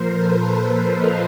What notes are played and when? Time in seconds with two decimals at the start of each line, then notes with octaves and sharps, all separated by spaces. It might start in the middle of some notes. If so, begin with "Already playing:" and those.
Already playing: A#2 F3 A#4 C5
0.10 A4 B4
0.57 A4 B4
0.88 D#5 F5